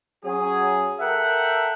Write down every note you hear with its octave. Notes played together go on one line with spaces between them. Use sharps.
F#3 C#4 G#4
A4 A#4 E5 F#5 G5